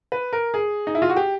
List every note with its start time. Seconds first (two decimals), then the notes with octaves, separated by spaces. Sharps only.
0.12 B4
0.33 A#4
0.54 G#4
0.87 D#4
0.95 E4
1.02 F4
1.10 F#4
1.16 G4